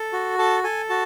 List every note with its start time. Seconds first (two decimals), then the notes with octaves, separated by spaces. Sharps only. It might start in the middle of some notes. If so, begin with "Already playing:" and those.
Already playing: A4
0.13 F#4
0.39 A4 A5
0.64 A4 G#5
0.90 F#4 A5